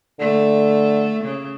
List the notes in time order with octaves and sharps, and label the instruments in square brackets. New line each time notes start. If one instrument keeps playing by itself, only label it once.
[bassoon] D3 [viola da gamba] A3
[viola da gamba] C#3